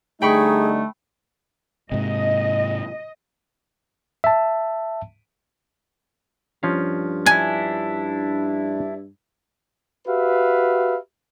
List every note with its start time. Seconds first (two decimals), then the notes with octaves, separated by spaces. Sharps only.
0.22 D3 G3 A3 D#4 G#4 G5 B5 C#6
1.92 G#2 C3 D#5
4.24 E5 A5
6.63 G2 F3 C#4 F5
7.26 D4 E4 G#5
10.08 F#4 G4 B4 E5 F5